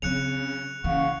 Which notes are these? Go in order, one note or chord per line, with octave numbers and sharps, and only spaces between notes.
C#3 F#3 C4 F#6 C#7 F7
C#3 E3 A#3 F5 F#5 C#6